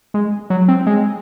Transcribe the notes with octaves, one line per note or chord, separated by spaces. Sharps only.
G#3
F#3
C4
G#3